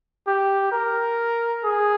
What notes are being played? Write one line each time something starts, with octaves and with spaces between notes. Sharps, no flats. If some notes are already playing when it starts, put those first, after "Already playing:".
G4
A#4
G#4